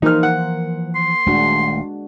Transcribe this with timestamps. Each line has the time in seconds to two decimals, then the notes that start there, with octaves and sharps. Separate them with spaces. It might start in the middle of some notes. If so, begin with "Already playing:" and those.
0.02 E3 F3 A#3 D#4 A#4 C5 F6
0.23 F#5
0.96 C6
1.26 D#1 D#2 G#3 A3 D4 F#4